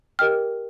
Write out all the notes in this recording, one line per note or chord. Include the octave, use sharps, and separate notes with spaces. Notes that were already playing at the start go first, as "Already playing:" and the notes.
G4 A#4 D#5 G5 F6